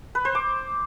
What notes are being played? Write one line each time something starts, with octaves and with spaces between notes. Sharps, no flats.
B4
C5
D6